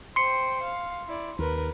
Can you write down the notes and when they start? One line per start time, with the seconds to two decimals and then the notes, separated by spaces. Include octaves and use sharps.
0.16 C5 G5 C6 C#7
0.63 F5
1.08 E4 D5
1.39 D#2 A#4 B4